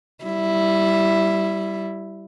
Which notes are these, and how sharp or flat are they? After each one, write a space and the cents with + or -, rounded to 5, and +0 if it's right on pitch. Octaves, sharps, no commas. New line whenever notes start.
G3 -15 E4 +0